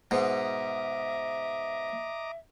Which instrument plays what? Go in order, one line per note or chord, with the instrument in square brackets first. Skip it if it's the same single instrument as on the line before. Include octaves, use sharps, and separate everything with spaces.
[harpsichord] G#2 B2 [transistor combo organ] D#5 A#5 D6 [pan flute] E5